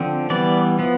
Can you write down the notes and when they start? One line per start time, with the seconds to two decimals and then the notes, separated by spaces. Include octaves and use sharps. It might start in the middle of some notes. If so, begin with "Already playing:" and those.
Already playing: D3 F3 C4
0.30 E3 G3 B3 D5
0.79 F3 B3